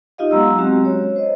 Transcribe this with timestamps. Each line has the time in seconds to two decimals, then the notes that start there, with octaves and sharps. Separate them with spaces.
0.18 D#4 F4 G4 D#5 F5
0.31 F#3 G#3 B3 A#5 C6 E6
0.58 F#3 G#3 C4 C#4 F#4 G4
0.85 C#5
1.16 C5 D#5